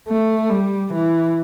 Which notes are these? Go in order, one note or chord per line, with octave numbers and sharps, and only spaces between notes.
A3
G3
E3